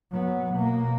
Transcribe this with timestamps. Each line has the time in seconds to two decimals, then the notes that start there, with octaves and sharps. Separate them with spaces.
0.12 F#3 B3
0.53 B2 A#3